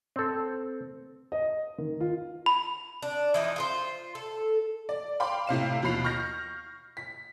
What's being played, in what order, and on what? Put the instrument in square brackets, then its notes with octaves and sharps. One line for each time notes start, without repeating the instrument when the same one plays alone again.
[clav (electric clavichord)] C4 A4
[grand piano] D#5
D#3
F4
[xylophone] B5
[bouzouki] D4
E3 F3 D#4
F4 G#4 C5
A4
[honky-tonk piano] D5
F5 G5 B5 C6 D6
A2 C3 F5 E7
D#2 B2 F3 B5 C7 F7
C#6 F6 G6 A#6
B6